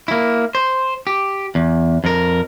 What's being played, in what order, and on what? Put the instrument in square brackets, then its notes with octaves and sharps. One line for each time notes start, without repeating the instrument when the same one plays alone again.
[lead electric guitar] A#3 E4
C5
G4
E2
F2 A#4